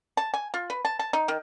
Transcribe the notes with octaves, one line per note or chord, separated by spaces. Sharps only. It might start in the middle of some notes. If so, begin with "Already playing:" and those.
A5
G#5
F4
B4
A5
A5
D#4
D#3